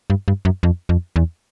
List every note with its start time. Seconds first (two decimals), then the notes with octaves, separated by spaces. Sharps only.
0.10 G2
0.28 G2
0.45 F#2
0.63 F2
0.89 F2
1.16 E2